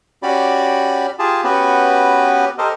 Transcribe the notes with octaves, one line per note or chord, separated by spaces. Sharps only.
C#4 F#4 G4 D5 B5
F4 G4 G#4 A5
B3 C#4 F#4 G4 B4
G4 A4 A#4 C5 D#5